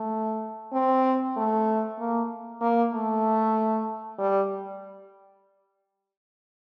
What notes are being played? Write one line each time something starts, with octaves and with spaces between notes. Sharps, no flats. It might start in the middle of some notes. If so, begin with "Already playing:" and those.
Already playing: A3
C4
A3
A#3
A#3
A3
G3